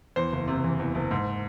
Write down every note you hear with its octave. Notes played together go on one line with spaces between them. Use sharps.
E2 C5
F#1
C3
E3
E2
F#1
G#2